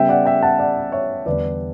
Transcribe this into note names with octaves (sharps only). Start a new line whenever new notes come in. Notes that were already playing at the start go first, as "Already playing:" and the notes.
Already playing: C#3 G3 B3 E5 G5
D5 F#5
E5 G5
F#5 A5
D5 F#5
C#5 E5
E2 D3 G3 B3 B4 D5